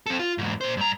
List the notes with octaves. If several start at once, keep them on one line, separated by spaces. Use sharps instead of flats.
C4 A4
F4
E2 G#2
A#2 C5
G2 A#5